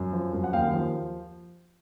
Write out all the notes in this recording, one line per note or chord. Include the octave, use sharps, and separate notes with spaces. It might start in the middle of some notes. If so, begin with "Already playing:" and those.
Already playing: F#2
F3
F#2
F#5
D#2 F5 G5
F3